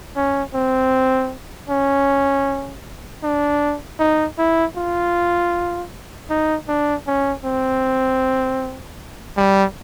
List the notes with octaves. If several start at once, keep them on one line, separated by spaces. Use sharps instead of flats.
C#4
C4
C#4
D4
D#4
E4
F4
D#4
D4
C#4
C4
G3